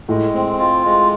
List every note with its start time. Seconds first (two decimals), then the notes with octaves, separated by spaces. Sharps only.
0.09 A2 G#3
0.33 C4
0.58 F4
0.85 G#3